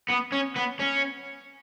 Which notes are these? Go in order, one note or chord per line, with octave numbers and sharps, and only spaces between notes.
B3
C#4
B3
C#4